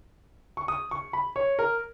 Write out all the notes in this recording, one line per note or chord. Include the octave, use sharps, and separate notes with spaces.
C#6
D#6
C#6
B5
C#5
A#4